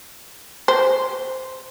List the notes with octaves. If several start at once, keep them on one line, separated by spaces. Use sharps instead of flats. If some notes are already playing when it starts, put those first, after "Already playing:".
C5